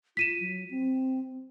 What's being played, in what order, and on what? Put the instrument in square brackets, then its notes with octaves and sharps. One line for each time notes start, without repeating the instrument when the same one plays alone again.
[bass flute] F4 [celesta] B6 D#7 E7
[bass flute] F#3
C4